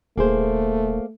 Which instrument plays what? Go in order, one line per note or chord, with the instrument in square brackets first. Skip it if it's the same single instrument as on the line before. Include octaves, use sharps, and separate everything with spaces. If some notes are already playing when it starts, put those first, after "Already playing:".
[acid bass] D#1 [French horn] A3 [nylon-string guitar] A#3 G#4 C5